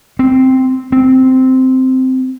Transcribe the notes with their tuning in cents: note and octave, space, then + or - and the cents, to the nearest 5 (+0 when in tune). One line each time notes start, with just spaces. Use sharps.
C4 -5
C4 -10